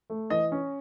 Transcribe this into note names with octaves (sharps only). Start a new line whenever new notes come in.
A3
E3 D#5
C#4